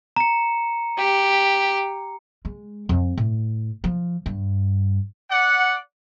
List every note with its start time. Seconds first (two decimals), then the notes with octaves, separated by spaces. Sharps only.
0.16 A#5 C#7
0.98 G4
2.45 G#3
2.89 F2
3.17 A2
3.84 F3
4.26 G2
5.31 D5 F#5